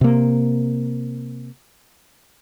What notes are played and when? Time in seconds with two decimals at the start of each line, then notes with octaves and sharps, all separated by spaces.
0.01 C3 A#3